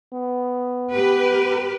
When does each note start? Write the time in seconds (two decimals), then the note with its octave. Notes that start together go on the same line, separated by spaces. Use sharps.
0.13 B3
0.93 G4 B4